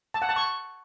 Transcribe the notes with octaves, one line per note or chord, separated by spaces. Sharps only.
A5
F#5
A5
C#6